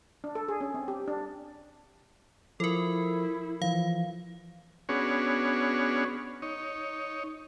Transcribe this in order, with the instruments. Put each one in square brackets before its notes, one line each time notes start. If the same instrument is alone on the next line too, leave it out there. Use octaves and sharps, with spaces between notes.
[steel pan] D4
A4
G#4
C#4
C4
G4
D4
[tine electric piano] F3 [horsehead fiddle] E4 [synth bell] A4 A#4
[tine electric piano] E3 F3 [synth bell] F5
[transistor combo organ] B3 C#4 D4 F#4 G#4 C#5
D#4 C#5